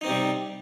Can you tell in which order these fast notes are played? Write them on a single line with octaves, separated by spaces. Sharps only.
D#4 C4 C3 G3